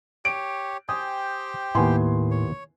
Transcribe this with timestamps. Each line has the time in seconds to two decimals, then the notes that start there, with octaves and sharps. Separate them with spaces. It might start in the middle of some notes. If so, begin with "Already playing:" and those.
0.25 G4 C#5 D7
0.89 G4 C5 G5 G#5 D#6
1.75 D#2 A2 B3 E4 G#5 C6
2.31 C#5